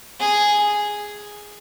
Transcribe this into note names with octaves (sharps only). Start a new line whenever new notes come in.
G#4